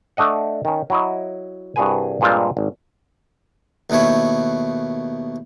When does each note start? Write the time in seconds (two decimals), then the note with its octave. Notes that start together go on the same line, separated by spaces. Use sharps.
0.17 A3 D4 D#5 F#5
0.65 D#3 C#4
0.90 F#3 E4 D#5
1.76 C2 G2 F#4 G#4 B4 G#5
2.21 G2 A#2 G#3 C4 F4
2.57 G#1
3.90 D#2 B2 A3 E4 C#5